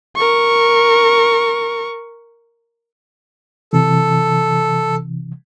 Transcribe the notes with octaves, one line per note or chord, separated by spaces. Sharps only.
A#4 C#6
C3 E3 A4